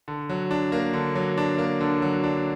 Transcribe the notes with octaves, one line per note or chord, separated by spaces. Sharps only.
D3
F#3
D4
A#3
D3
F#3
D4
A#3
D3
F#3
D4